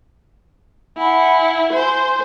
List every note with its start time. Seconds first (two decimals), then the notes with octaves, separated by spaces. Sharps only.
0.97 E4 F#5 G#5 B5
1.73 C5 G#5 C6